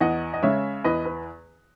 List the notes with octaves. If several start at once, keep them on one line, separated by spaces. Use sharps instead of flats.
E2 D#5 F#5
D#5
C#3 G#3 C#5 E5
E2 B4 D#5
B4